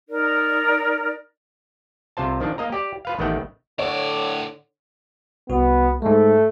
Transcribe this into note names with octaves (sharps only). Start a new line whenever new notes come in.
D#4 A#4 D5
C2 C3 F4 C5 A5
D#3 F3 D4
A#3 D#5 A#5
G4 D5
F4 B4 F5
A1 D#3 A3 B3 F#5 G5
A2 D3 C#5 D5
C2 B3 F#4
G#2 G#3 A3